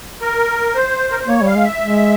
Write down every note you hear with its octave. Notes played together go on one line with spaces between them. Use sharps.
A#4
C5
A#4
C5
A#3 C#5
G3 F5
G#3
E5
G#3